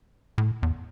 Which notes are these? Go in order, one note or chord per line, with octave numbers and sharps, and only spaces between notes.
A2
E2